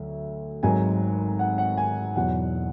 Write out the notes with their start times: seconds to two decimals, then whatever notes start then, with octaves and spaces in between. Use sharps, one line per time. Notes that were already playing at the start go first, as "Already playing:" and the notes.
Already playing: D2 D3 F#3 E5
0.63 G#1 G#2 F#3 G#5
1.39 F#5
1.58 F#5
1.77 G#5
2.16 E2 B2 F#3 F#5